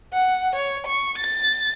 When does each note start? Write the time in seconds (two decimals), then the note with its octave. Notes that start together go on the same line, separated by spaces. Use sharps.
0.13 F#5
0.55 C#5
0.87 C#6
1.18 A6